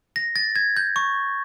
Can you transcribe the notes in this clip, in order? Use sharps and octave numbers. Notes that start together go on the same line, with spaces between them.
A#6
A6
G#6
G6
C#6